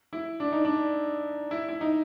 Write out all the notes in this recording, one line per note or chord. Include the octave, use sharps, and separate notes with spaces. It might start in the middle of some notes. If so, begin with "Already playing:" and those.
E4
D4
D#4
D4
E4
E4
D#4